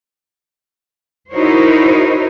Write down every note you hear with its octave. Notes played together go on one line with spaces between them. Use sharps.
D#4 E4 F#4 A#4 C5 C#5